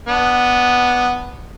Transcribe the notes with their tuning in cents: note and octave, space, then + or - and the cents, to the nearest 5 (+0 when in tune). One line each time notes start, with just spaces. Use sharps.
B3 +0 D4 +0